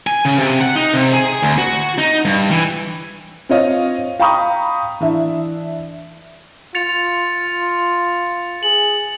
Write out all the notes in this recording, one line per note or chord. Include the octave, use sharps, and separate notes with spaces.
G#5
C#3
C3
F#5
D#4
C3
G#4
D2
F#4
D#4
G2
E3
C4 F4 C#5 D#5 F5
F5 G5 A#5 B5 C#6 D#6
E3 D4 E5
F4 A6 C#7 F7
G#4 F#7